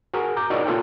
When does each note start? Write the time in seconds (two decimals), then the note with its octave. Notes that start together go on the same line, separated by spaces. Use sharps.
0.14 F#4 G#4 A#4
0.37 A#5 D6 G6
0.50 D#4 E4 F#4 A#4 C#5 D5
0.66 A#3 F4 A4 C#5 G5